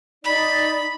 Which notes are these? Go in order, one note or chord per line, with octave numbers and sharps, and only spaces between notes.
D#4 D5 B5